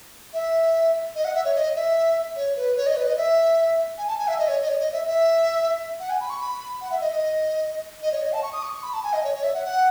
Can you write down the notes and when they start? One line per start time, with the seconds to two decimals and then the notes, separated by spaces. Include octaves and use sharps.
0.33 E5
1.15 D#5
1.25 F#5
1.34 E5
1.45 C#5
1.55 D#5
1.76 E5
2.36 C#5
2.57 B4
2.77 C#5
2.87 D#5
2.96 B4
3.06 D#5
3.17 E5
3.98 G#5
4.08 A5
4.18 G#5
4.28 E5
4.38 D#5
4.48 C#5
4.62 D#5
4.68 C#5
4.79 D#5
4.92 E5
5.06 E5
6.00 F#5
6.10 G#5
6.20 B5
6.30 C#6
6.41 B5
6.81 F#5
6.91 E5
7.01 D#5
7.11 D#5
8.02 D#5
8.12 C#5
8.23 D#5
8.33 A5
8.43 C#6
8.53 D#6
8.63 C#6
8.74 C#6
8.83 B5
8.94 A5
9.03 G#5
9.13 D#5
9.24 C#5
9.34 C#5
9.43 E5
9.54 F#5
9.64 F#5